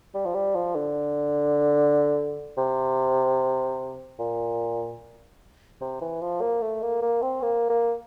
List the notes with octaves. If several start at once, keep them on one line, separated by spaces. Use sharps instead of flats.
G3
F3
G3
F3
D3
C3
A#2
C3
E3
F3
A#3
A3
A#3
A#3
C4
A#3
A#3